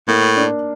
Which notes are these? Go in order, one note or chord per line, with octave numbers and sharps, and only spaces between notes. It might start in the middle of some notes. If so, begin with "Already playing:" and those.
A2 A#3
D4